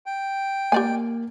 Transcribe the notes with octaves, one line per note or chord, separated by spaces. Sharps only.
G5
A#3 G4 D5 G#5